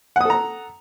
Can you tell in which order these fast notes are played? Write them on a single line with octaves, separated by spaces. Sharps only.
F#5 D#6 A4 A#5